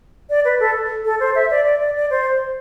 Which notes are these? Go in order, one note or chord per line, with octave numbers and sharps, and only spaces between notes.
D5
B4
A4
A4
C5
E5
D5
D5
D5
D5
C5